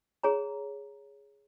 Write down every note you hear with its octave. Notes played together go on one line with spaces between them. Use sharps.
G#4 C#5 A#5